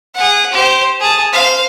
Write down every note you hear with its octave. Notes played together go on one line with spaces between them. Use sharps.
G#4 F#5
G4 C5
G#4 A5
C5 F5